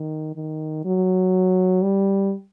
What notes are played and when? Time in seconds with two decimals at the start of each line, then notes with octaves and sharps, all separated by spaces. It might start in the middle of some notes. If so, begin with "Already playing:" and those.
Already playing: D#3
0.36 D#3
0.85 F#3
1.82 G3